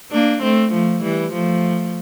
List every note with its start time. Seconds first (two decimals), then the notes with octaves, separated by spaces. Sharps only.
0.12 A#3 D4
0.43 A3 C4
0.73 F3 A3
1.03 E3 G3
1.33 F3 A3